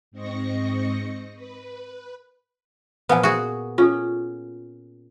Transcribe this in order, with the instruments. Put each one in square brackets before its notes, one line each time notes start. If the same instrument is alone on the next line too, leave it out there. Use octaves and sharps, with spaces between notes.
[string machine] G#2 C4 D#5 C#6 A#6 C#7
B4
[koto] A#2 F3 B3 [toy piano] B4 F#5 G#5
[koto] F#4 G#4
[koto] C#4 [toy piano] F4 G#4 A4